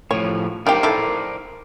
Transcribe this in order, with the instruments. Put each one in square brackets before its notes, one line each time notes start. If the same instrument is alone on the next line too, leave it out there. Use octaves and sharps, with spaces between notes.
[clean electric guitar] A2 F3 [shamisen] C#5
[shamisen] D#3 D4 G4 [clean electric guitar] A#4 C5 D5
[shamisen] D#3 E4 A4